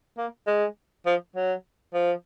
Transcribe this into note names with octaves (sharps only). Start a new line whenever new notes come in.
A#3
G#3
F3
F#3
F3